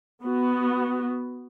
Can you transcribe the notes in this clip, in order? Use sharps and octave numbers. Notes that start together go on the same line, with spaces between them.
B3 F#4